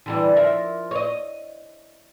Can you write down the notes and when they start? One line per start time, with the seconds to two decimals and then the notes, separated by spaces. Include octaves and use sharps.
0.06 D3 E3 G3
0.36 F3 A#4 E5
0.91 C#5 D#5